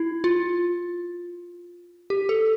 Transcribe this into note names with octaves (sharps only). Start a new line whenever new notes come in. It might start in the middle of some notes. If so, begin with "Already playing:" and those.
Already playing: E4
F4
G4
A4